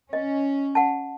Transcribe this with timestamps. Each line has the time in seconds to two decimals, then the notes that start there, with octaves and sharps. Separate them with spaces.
0.13 C#4 D#5
0.75 F#5 A5